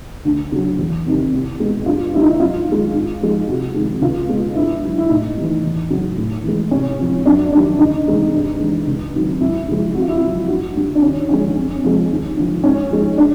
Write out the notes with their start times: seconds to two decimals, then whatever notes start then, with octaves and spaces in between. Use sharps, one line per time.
0.25 D2
0.52 C#3 F#3
0.79 E2
1.06 C3 D#3 G3
1.33 C2
1.60 B2 G#3
1.86 G2 F4
2.14 D3 G3 E4
2.21 D#4
2.29 E4
2.40 F#2 F4
2.67 D#3 G#3
2.93 G#2
3.21 F3 G#3
3.47 C2 F#4
3.74 C3 D#3 G#3
4.01 C#2 F4
4.29 B2 G#3
4.55 G2 E4
4.83 D3 F#3
4.98 E4
5.09 A2 D#4
5.36 E3 G3
5.63 E2
5.90 C#3 F#3
6.17 A2
6.44 E3 G#3
6.71 C2 C#4
6.98 C3 F3
7.26 F#2 D4
7.52 D#3 G3 D4
7.79 D2 D#4
8.05 C3 E3 G#3
8.33 G2
8.60 E3 G#3
8.87 C#2
9.13 C3 D#3 F#3
9.40 F#2 E4
9.68 C#3 F3 G#3
9.95 F2 F#4
10.02 F4
10.08 E4
10.15 F4
10.21 C#3 F#3
10.48 G2 F#4
10.75 D3 G3
10.95 D4
11.02 D#2 C#4
11.29 D3 F3 G#3 C#4
11.56 F2
11.83 C3 F3 G#3
12.10 D#2
12.37 D3 F3
12.64 G#2 C#4
12.90 F3 G#3
13.18 D4